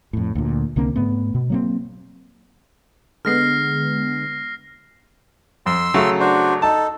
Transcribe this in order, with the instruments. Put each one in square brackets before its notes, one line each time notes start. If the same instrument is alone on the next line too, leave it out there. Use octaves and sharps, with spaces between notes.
[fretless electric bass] F2 A2
D2 A#2
C2 D3 A#3 C4
G#2 A3 B3
B2
F#3 A#3 C4
[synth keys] D3 G#3 B3 [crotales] F6 A#6 C7
[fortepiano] F2 [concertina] C6 E6
[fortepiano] C#3 F#3 A3
[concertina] D4 F#4 C5
[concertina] D#4 A4 [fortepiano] A5